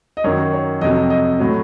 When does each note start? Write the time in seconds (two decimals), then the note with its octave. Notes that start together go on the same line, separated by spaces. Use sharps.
0.17 D#5
0.24 F#2 D#3 F#3 C#5
0.53 C#5
0.81 F2 C3 F#3 D#5
1.10 D#5
1.39 A2 F#3